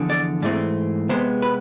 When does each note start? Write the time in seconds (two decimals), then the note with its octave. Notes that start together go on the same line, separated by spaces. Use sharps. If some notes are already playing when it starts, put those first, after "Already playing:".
Already playing: E2 D3 F3
0.10 D5
0.42 G#2 E3 A3 C4 D5
1.09 C3 G#3 B3 C5
1.42 B4